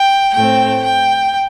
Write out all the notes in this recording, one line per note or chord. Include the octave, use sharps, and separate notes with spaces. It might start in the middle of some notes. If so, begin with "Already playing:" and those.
Already playing: G5
A2 A3 C4 G5
G5